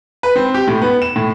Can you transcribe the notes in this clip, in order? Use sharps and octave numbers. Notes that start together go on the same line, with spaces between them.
B4
C4
G4
A2
B3
E7
A2